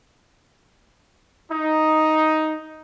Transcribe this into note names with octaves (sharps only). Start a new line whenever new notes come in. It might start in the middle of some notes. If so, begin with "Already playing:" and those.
D#4